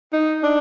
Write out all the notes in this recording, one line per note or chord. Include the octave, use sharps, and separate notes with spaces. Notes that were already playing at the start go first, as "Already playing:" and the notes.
D#4
D4